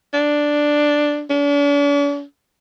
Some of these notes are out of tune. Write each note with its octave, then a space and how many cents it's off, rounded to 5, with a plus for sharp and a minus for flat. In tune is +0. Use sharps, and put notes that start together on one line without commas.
D4 +0
D4 -45